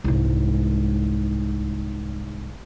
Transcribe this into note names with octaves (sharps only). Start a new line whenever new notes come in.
C2 G#2